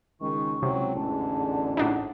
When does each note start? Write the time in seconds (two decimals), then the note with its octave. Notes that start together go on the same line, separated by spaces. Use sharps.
0.21 C#2 D#3 G#3 C#6
0.63 C3 F#3 C4 E4
0.95 A1 E2 G#2 D3 A5
1.77 A2 D4 D#4 F#5